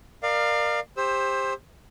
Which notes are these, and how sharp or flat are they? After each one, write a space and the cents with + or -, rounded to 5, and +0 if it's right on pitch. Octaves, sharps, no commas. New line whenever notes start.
A#4 +0 D5 +35 F5 +0
G4 +25 C5 +15 E6 -10